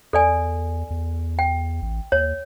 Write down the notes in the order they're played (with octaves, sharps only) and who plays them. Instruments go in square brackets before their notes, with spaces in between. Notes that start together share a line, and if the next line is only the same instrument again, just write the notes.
[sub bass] E2 [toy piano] A4 D5 G#5
[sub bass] E2
[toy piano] G5
[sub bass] A1
[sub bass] D#2 [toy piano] C#5